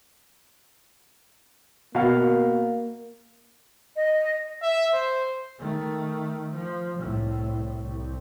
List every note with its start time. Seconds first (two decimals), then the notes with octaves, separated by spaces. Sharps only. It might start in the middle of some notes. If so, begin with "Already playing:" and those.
1.95 B2 A#3 F5
3.97 D#5
4.63 E5
4.93 C5
5.59 D#3 A3
6.54 F3
6.99 C2 A2
7.83 C2